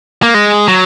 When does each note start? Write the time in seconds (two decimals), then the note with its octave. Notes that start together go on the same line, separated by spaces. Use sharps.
0.23 A#3
0.34 G#3
0.68 F#3